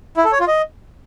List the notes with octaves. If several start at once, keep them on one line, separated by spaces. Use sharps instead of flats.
E4
A4
C#5
F4
D#5